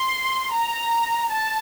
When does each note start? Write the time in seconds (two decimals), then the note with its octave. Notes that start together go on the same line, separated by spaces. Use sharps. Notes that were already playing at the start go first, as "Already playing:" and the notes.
Already playing: C6
0.53 A#5
1.30 A5